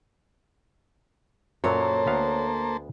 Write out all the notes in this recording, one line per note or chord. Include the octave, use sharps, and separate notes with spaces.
F#2 A#2 F#3 A#3 A4 C5 C#5
D2 B3 F5